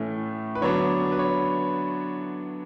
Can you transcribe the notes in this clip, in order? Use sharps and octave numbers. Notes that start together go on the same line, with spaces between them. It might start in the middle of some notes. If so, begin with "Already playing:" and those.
Already playing: A2 E3 A3 C#4
B4
D3 F#3 B3 D4 C#5
B4
C#5